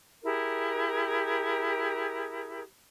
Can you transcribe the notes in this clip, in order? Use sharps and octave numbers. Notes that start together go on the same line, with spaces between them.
E4 G4 G#4 A#4